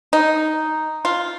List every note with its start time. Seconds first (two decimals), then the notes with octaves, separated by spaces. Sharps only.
0.13 D#4
1.05 F4